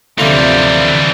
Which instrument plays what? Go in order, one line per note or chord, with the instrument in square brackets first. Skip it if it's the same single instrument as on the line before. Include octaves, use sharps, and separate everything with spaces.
[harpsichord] D2 F4 [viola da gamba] C3 F3 [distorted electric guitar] E3 G3